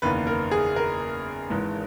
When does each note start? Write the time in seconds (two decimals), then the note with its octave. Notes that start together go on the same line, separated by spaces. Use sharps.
0.02 F#1 E2 D#3 A#3 B4
0.27 A#4
0.51 G#4
0.76 A#4
1.50 G#1 G#2 E3